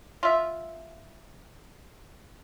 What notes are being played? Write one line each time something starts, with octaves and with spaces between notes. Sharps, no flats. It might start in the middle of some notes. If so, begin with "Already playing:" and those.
F4 E5